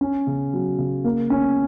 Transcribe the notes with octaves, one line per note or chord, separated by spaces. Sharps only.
C#4
C#3
F#3
C#3
A#3
C#4